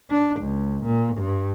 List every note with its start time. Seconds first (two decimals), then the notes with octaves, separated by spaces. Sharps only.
0.11 D4
0.41 C#2
0.85 A#2
1.17 G2